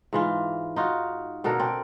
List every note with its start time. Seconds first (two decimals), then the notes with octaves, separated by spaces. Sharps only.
0.13 G#2 E3 F4
0.76 D#4 F4 F#4
1.44 B2 D3 A4 A#4
1.59 C4 D4 D5